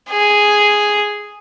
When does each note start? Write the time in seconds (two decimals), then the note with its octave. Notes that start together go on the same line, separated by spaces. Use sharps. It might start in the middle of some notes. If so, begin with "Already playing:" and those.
0.09 G#4